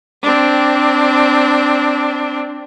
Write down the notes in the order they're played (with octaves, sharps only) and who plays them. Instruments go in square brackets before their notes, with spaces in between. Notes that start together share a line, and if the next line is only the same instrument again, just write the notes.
[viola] C4 D4